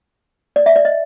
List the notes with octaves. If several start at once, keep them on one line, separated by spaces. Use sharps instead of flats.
D5
E5
D5
D#5